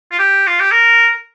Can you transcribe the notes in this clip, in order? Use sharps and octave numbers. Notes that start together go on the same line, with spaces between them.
F4
G4
F4
G4
A#4